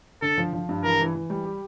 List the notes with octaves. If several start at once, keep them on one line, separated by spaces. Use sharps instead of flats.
D3 A4
F3
F3
G2
E3 A#4
E3
E3
G3
G4